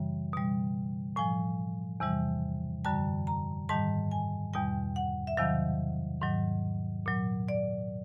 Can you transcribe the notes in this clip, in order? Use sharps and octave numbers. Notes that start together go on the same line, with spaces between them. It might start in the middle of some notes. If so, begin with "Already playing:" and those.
Already playing: F#2 C#3 E3 G3
B2 G3
A2 F3 G#5
E2 C3 E3 G3
F#2 D3 G3 A5
A#5
G#2 D#3 G3 A5
G#5
E2 B2 G3 G5
F#5
E5
E2 C3 D#3 F#3 F5
G#2 D#3 F#3
A#2 F#3
D5